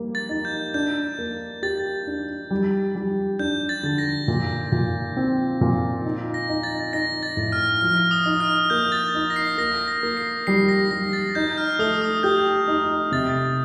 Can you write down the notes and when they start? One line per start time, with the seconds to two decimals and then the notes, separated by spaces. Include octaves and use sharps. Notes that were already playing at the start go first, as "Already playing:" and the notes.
Already playing: G3 A#3
0.15 A6
0.29 D#4
0.45 G6
0.74 D4 G6
1.18 A#3
1.63 G4 A6
2.07 D4
2.50 G3
2.95 G3
3.39 D4 G6
3.69 A6
3.83 D3
3.98 A#6
4.28 A#2
4.72 A#2
5.17 C4
5.61 A#2
6.05 D#4
6.34 A#6
6.49 D#4
6.63 A6
6.93 D#4 A#6
7.23 A6
7.37 A2
7.52 F6
7.81 F3 F6
8.11 D#6
8.25 D#4
8.40 F6
8.70 A#3 G6
8.92 A6
9.15 D#4
9.30 A#6
9.36 C7
9.58 A#3 A#6
9.88 A#6
10.03 A#3
10.17 C7
10.47 G3 C7
10.69 A#6
10.91 G3 A#6
11.13 A6
11.35 D#4 G6
11.58 F6
11.79 A3 D#6
12.02 D#6
12.23 G4 G6
12.68 D#4
13.12 C3 A6